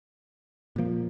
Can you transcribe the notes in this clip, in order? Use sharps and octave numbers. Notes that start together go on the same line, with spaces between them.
A#2 F3 A#3